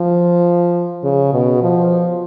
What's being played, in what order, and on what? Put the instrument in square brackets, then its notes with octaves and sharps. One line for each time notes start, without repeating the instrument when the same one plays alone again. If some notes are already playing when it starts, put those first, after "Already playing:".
Already playing: [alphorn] F3
C#3
B2
F3